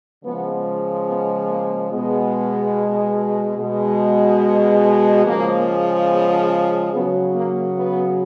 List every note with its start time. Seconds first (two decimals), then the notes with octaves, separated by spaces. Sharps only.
0.23 C#3 F3 G#3 B3
1.07 B3
1.48 A#3
1.90 B2 G#3 B3
3.58 B2 G#3
5.25 C#3 F3 G#3 A#3
6.09 B3
6.93 C#3 F#3 B3
7.35 A#3
7.76 B3